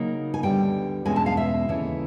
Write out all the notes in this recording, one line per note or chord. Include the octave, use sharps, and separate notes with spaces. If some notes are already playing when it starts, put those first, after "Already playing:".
Already playing: C#3 F#3 A#3 D#4
G#5
D2 D3 G3 B3 G5
E2 B2 G#3 C#4 G#5
A5
F5
E5
D#2 C#3 E3 A3 C#4